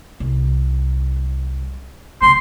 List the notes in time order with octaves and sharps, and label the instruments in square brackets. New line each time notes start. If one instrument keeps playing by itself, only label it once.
[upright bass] C2
[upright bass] C#3 A3 [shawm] C6